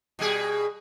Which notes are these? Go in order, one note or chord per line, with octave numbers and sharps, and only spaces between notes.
B2 G3 G#4